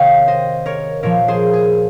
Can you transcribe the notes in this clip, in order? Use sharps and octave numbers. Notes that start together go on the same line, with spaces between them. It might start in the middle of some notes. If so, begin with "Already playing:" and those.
Already playing: C3 D#3 C#5 F5 G5
C5 D#5
A#4 C#5
A#2 F3 A#4 C#5
G#4 C5
G#4